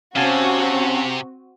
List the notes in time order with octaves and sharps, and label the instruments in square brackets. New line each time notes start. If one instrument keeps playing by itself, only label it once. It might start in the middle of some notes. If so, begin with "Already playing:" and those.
[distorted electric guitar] C3 [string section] C4 F#4 [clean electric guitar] C#4 [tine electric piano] F5 G#5 A5